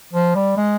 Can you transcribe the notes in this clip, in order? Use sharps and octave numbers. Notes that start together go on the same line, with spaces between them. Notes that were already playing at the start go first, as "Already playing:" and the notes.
F3
G3
G#3